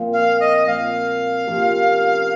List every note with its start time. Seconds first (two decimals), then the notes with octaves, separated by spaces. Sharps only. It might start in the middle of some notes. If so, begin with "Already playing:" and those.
Already playing: A#2 F3 C4
0.13 F5
0.40 D#5
0.66 A#2 F3 C4 F5
1.46 C3 F3 A#3 C#4